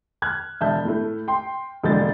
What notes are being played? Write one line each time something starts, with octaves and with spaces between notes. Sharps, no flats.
F6 F#6 G#6
E1 E5 A5 G6
A2 A3
G5 C6
E1 A#1 D3 G#3 G6 A6